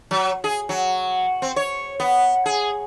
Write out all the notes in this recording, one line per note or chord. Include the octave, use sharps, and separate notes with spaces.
F#3
G#4
F#3
C4
C#5
B3
G#4